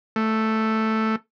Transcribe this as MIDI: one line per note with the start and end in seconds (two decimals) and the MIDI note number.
0.16 1.16 57